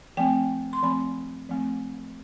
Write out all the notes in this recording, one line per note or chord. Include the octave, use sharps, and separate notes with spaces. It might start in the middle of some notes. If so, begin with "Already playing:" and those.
F3 A3 C4 G5
C6
F3 A3 C4 B5
F3 A3 C4